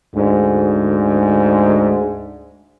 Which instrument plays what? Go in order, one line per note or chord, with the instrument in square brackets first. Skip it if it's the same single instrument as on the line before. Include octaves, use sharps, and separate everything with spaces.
[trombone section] D2 G#2